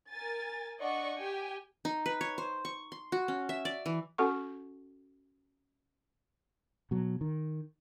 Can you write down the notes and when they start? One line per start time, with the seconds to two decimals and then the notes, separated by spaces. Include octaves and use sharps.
0.10 A#4 G#5 A6
0.80 D4 D5 D#5 F#5 C#6
1.17 G4 G5 G#5
1.85 D#4
2.06 B4
2.21 C#5
2.38 C5
2.65 C#6
2.92 C6
3.12 F#4
3.28 C#4
3.49 E5
3.65 D5
3.86 E3
4.18 C#4 F#4 A4 F#5 C#6
6.91 B2 F#3
7.21 D#3